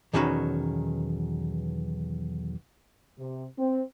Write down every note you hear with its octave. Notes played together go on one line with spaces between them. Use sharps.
B1 E2 D#3 C#4 F#4 B5
C3
C4